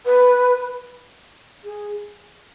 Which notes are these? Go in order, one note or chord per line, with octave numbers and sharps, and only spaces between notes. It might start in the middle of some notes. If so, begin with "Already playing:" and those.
B4
G#4